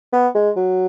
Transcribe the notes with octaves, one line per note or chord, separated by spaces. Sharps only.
B3
G#3
F#3